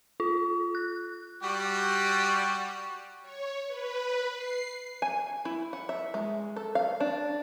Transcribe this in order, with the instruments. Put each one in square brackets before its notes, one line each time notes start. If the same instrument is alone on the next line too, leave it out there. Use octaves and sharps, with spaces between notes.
[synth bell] F4
F#6
[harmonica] G3 F#4 G4
[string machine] C#5
B4
C7
[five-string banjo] G#5
E4
F#5
E5
G#3
A4
F5
D4